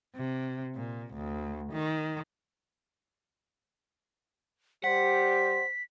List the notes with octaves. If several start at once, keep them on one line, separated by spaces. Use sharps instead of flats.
C3
A#2
D2
D#3
G3 G4 C5 F#5 B6